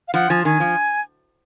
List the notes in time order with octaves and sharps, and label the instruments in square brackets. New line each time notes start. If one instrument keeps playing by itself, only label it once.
[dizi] F5
[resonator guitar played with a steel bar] F3 [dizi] F#5
[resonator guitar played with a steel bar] F3 [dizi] G#5
[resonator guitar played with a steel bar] D#3 [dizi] G#5
[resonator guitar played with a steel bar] F3